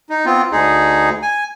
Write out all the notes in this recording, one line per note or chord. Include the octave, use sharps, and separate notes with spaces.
D#4
B3 C4 F4
D2 D#4 G#4
G#5